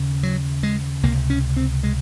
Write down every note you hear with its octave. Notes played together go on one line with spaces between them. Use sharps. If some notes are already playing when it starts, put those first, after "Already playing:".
Already playing: D#2 C#3
F#3
G#3
C#2 C3 A#3
C#4
C4
G#3